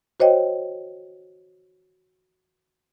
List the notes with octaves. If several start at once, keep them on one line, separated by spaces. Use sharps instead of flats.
F#4 C5 C#5 D#5 G5